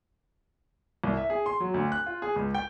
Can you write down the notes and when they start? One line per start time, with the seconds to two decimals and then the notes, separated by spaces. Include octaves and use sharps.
1.04 C2
1.17 E5
1.30 G#4
1.46 C6
1.60 F#3
1.74 D2
1.92 F#6
2.06 F4
2.22 G#4
2.36 C#2
2.54 G5